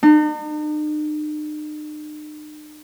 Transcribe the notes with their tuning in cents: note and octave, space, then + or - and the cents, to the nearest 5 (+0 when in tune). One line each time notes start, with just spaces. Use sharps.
D#4 -45